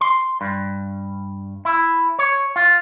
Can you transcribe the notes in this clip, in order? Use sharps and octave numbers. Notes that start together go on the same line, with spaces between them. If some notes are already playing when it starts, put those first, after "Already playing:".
C6
G2
E4
C#5
F4